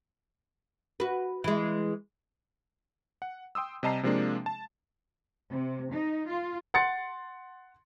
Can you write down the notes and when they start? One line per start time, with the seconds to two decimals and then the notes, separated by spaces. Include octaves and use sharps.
1.00 F#4 B4
1.44 E3 G#3
3.22 F#5
3.55 G5 C6 D#6 E6
3.83 C3 G3 D#5 A5 A#5 C7
4.03 C3 F3 G#3 A#3 D4
4.46 A5
5.50 C3
5.92 D#4
6.28 F4
6.74 F#5 C6 A6 C#7